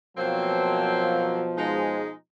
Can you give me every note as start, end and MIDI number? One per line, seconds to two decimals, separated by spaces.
0.17 2.16 47
0.17 2.16 53
0.17 1.43 54
0.17 1.43 58
0.17 1.43 60
1.56 2.09 56
1.56 2.09 63